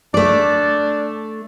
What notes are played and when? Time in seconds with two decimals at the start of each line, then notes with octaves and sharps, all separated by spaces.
0.14 A3 D4 D5